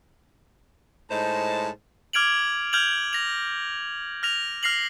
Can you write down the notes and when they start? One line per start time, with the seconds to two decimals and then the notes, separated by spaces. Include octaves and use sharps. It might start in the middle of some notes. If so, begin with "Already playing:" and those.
1.11 A2 G#3 D#4 C5 A5
2.13 D6 F6 G#6 D7 F7 F#7
2.73 F6 G6 G#6 F7 F#7
3.13 A#6 F7
4.23 F6 A#6 F7
4.63 F6 A#6 C7 F7 F#7